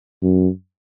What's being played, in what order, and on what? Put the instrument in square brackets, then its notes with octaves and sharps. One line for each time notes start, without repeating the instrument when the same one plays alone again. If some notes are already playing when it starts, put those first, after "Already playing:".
[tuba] F#2